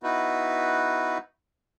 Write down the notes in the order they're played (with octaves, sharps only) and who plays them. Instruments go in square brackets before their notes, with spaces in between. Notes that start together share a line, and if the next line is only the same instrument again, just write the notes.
[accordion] B3 D#4 E4 F#4 B4